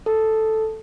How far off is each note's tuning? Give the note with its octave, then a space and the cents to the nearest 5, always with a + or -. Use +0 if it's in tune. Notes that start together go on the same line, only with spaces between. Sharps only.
A4 +0